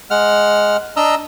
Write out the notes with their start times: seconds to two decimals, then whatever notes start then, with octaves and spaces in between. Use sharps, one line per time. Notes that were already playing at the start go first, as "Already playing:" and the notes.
0.10 G#3 F#5 F6
0.97 D4 D#5 A#5 E6